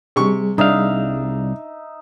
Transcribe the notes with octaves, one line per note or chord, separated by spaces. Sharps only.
C3 G3 G#4 C#6
C2 D4 D#4 E5 F5